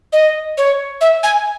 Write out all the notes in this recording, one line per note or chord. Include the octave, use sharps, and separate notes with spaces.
D#5
C#5
E5
G#5